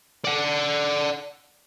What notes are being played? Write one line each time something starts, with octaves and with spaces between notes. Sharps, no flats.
D5 F#5